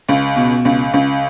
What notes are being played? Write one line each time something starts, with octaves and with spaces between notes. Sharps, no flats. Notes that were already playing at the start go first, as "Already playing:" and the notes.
C#2
B2
C#2
C#2